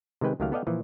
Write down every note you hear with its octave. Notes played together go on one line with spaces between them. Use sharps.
C3 D#3 G#3 B4 G5
C#2 D#3 F#3 A3 G4 F5
B3 A4 D5 D#5 F5 G5
A#2 E3 F3